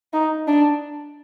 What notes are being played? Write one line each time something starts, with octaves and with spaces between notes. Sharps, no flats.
D#4
D4